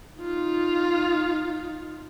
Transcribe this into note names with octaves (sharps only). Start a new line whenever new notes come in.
D#4 F4